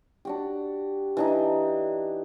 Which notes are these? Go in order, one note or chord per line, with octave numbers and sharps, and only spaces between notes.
D4 F#4 G4
E3 D4 D#4